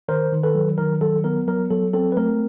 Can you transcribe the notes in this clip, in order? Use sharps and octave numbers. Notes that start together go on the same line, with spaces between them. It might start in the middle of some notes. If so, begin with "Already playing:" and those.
D#3 A#4 C5
D#3
A4 B4
F#3
D#3 A#4
F#3 A4
B3 A#4
F#3 A#4
F#3 A4
C4 A4
B4
A3 A#4